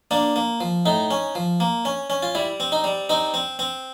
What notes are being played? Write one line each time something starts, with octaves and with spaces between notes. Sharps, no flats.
A#3 D4
A#3
F3
A2 D#4
C#4
F3
A#3
C#4
C#4
F4
G3 E4
C4
D#4
G3
C4 D#4
C4
C4